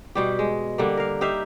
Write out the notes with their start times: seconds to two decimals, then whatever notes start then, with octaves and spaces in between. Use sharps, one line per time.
0.15 B2 G3 G4
0.39 G#3
0.78 D3 G3 A#3
0.97 A#4 F5
1.21 D#4 G4 E5 F5